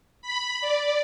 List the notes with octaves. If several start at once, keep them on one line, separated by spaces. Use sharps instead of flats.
B5
D5